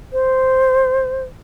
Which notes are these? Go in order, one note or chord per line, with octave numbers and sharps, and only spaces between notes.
C5